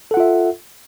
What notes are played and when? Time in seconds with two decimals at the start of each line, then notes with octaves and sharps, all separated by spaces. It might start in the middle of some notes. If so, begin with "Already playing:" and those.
0.11 A4
0.14 F#5
0.17 F4
0.20 E5